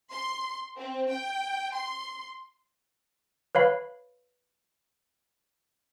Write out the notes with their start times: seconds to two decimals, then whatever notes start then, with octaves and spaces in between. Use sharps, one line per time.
0.13 C6
0.78 C4
1.09 G5
1.73 C6
3.55 B4 C#5 F5 B5